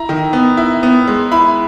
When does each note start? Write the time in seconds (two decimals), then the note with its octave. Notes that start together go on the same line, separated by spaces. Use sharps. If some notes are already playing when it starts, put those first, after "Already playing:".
Already playing: E4 A#5
0.09 D#3
0.33 B3
0.57 E4
0.83 B3
1.07 G#3
1.31 E4 B5